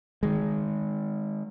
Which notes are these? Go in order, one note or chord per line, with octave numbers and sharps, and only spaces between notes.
D#3 G#3